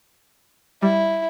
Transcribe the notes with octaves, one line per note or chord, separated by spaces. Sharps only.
G3 E4